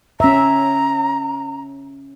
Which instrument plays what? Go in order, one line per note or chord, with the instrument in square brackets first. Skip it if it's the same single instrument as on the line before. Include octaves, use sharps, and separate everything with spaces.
[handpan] C#4 E5 [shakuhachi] A#5